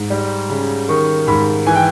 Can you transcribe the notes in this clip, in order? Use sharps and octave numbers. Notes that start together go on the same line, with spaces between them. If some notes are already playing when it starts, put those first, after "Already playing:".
Already playing: G#2
G3
C#3
D#3 C#6
G#2 B5
E3 G#5
G5